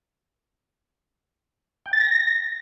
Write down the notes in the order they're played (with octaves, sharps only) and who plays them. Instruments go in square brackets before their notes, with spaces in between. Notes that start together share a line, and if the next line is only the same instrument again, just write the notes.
[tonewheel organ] G5
A6
A#6